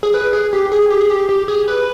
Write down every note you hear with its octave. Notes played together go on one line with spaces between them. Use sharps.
G#4
B4
G#4
G4
G#4
G4
G#4
G4
G4
G#4
B4